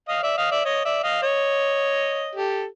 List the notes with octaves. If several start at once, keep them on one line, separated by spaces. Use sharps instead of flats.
D#5 F5
D5 E5
D#5 F5
D5 E5
C#5 D#5
D5 E5
D#5 F5
C#5 D#5
G4 A4